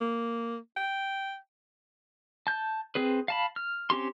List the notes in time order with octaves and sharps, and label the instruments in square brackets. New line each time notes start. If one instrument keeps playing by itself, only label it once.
[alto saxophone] A#3
G5
[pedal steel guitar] A5 G6
C4 G#4 B4
F5 A5 B5
F6
C4 C#4 G4 C6